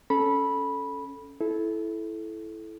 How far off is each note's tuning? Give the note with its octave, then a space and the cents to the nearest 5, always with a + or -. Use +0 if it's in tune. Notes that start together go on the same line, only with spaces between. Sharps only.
C#4 +0 A4 -5 B5 -15
E4 +0 A4 -20